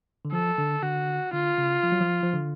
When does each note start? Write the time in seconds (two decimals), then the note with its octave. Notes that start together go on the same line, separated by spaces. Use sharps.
0.25 D3
0.33 F3 A4
0.58 D3
0.82 D3 F#4
1.33 D3 F4
1.58 C#3
1.83 F3
1.92 F#3
2.01 F3
2.23 F3
2.33 D3